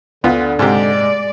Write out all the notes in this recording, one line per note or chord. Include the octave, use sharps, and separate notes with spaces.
D2 D3 B3 F4
G#2 C3 G#3 G4 D5